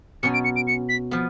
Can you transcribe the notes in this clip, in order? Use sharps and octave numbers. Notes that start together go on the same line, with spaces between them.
B2 F#3 C#4 C#7
D7
C#7
D7
C#7
B6
F3 B3